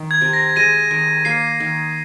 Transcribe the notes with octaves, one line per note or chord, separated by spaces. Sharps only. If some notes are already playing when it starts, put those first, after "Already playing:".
Already playing: D#3
G#6
C3
A#6
G#3 A#6 D#7
D#3
A#3 C7
D#3